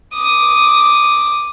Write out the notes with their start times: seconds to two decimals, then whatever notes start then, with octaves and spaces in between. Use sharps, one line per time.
0.13 D6 D#6